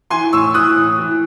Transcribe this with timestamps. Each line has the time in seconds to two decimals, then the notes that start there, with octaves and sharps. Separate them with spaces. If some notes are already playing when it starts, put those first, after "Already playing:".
0.10 E3 G#5 C6
0.32 A2 C#6 E6
0.54 E3 D#6 F#6
0.76 A2
0.98 E3